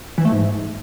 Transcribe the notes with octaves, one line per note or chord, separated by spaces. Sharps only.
E3
A3
G#2